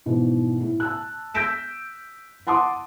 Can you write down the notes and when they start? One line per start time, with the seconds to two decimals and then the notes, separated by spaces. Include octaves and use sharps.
0.06 G#2 B2 E3 F3
0.60 A2
0.80 A5 E6 F#6
1.34 E6 G6 A#6 B6 D7 E7
2.47 F#5 A5 C6 D6 D#6